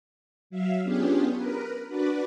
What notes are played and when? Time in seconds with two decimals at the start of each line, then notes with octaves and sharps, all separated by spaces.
0.50 F#3 E5 F5
0.84 B3 C#4 D4 F4 G4 G#4
1.35 A#4 B4
1.89 D4 F#4 B4 D5